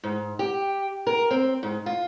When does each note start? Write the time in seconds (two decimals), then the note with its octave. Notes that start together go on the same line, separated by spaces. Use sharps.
0.04 G#2
0.39 G4
1.07 A#4
1.31 C4
1.63 G#2
1.86 F4